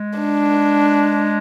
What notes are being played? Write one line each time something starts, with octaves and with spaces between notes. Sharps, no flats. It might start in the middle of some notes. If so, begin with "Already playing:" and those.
Already playing: G#3
D4